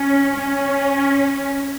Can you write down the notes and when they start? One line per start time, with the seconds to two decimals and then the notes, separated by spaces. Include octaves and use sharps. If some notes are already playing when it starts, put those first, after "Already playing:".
Already playing: C#4
0.36 C#4